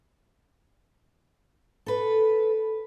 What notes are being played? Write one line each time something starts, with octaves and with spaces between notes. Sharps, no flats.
A4 B4